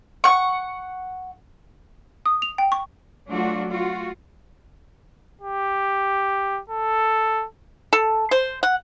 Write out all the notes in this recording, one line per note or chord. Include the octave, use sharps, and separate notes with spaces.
F#5 C#6
D#6
F7
G5
C#6
F#3 A3 D4 F4 F#4
F4 F#4
G4
A4
A4
C5
F#5